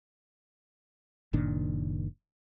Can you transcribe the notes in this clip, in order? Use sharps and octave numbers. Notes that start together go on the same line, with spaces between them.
F#1 A#2 D#3 D4